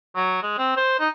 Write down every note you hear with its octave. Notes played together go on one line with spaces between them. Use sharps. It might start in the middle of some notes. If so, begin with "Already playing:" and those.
F#3
G#3
C4
C5
D#4